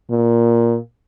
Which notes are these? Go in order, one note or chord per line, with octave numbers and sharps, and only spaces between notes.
A#2